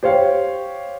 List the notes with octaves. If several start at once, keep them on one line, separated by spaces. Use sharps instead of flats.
G4 C5 C#5 F5